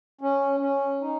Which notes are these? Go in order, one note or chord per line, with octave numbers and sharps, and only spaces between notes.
C#4
C#4
D#4